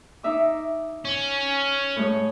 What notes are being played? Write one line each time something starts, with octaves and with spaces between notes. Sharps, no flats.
D#4 E5 D6
C#4
A2 G#3 C#5